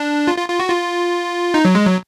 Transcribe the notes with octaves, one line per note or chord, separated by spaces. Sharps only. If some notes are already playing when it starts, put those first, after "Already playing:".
Already playing: D4
F4
F4
F4
F#4
F4
D#4
F#3
G#3
F#3